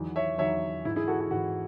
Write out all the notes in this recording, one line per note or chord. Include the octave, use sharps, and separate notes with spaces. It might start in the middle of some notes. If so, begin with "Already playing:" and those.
Already playing: E2 D#3 F#3
C#5 E5
E2 D#3 F#3 C#5 E5
G#2 E3 E4
E4 G#4
F#4 A4
F#4
G#2 E3 F#4